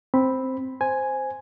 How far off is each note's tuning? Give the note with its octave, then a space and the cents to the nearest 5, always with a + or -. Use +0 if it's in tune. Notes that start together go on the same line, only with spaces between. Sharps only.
C4 +0 B5 +0
C5 +0 G#5 +0